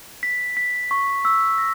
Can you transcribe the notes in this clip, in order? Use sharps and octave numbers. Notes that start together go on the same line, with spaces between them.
B6
B6
C#6
E6
A#6